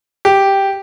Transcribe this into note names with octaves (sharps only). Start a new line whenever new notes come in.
G4